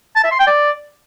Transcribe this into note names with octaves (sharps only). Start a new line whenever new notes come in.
A5
E5
C6
G5
D5